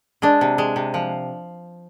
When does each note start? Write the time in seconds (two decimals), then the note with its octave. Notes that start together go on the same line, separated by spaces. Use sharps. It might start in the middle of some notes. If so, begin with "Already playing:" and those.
0.22 G#3 D4
0.41 C3
0.58 G#3
0.76 C3
0.94 F3